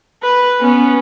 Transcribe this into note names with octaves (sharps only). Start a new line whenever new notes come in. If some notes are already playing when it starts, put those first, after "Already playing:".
B4
B3 C#4